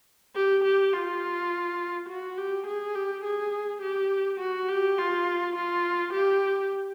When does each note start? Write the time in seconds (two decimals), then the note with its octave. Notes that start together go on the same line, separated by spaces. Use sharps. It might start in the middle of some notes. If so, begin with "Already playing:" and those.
0.36 G4
0.64 G4
0.93 F4
2.09 F#4
2.38 G4
2.67 G#4
2.95 G4
3.24 G#4
3.82 G4
4.40 F#4
4.69 G4
4.98 F4
5.56 F4
6.13 G4